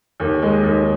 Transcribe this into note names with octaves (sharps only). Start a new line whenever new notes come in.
D#2
G#3
D#2